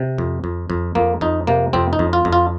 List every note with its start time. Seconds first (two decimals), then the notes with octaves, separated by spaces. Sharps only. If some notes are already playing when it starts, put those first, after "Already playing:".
Already playing: C3
0.18 F2
0.44 F2
0.70 F2
0.95 F2 A#3
1.21 F2 D#4
1.47 C3 A#3
1.73 F2 C4
1.93 D#4
1.99 F2
2.13 F4
2.25 F2
2.33 F4